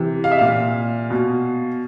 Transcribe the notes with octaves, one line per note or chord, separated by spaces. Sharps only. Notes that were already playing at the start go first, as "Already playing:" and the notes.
Already playing: C3 E3
F5
E5
A#2 F5
B2